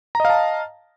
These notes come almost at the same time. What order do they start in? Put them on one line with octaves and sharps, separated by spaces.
A#5 D#5 F5 A5